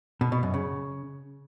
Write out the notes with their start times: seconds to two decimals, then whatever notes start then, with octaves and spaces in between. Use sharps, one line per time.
0.21 B2
0.32 B2
0.43 F#2
0.54 C#3